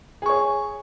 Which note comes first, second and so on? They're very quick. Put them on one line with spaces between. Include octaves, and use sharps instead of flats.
G#4 C#6 C#5